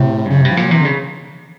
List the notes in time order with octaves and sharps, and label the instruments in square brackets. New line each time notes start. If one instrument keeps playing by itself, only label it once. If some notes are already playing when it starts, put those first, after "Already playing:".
Already playing: [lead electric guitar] A2 [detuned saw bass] C3
[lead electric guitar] G2
[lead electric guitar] F#2 [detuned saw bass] C#3
[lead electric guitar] G2 [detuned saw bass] C3
[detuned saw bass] F3
[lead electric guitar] A#2 [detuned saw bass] F#3
[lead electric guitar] C3 [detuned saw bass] E3
[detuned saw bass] D3
[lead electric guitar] C#3